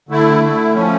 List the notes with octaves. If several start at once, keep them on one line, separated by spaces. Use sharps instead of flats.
D3 A3 E4
D3 A3 E4
F3 A3 C#4